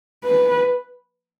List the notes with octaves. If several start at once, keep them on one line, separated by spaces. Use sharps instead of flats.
B4